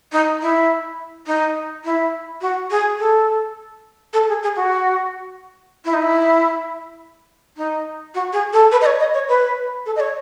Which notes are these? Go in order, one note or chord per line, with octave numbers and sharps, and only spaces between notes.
D#4
E4
D#4
E4
F#4
G#4
A4
A4
G#4
G#4
F#4
E4
D#4
E4
D#4
F#4
G#4
A4
B4
D#5
C#5
D#5
C#5
B4
A4
D#5
C#5